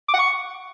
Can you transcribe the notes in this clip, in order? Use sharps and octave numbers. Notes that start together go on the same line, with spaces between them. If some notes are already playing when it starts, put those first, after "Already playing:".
D6
F#5
C#6